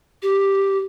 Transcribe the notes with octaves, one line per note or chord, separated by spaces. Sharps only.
G4